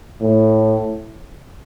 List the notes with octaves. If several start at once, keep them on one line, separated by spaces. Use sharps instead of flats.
A2